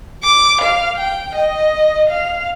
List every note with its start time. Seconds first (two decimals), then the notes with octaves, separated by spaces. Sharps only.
0.24 D6
0.61 F5
0.98 G5
1.35 D#5
2.09 F5